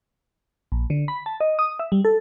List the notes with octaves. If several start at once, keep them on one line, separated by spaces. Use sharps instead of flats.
A#1
D3
B5
A5
D#5
D#6
E5
G3
A4